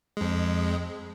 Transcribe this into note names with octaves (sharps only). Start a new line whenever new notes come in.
F2 G#3